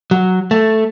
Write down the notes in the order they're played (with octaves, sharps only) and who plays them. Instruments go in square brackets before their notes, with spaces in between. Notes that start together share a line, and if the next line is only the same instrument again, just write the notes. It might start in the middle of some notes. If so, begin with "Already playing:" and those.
[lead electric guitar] F#3
A3